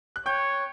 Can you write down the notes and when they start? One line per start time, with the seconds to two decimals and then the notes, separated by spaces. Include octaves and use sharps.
0.16 F#6
0.26 C#5 G5 G6